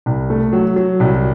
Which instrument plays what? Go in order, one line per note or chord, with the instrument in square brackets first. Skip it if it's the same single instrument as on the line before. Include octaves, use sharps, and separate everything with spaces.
[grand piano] C2
A3
F#3
F#3
C2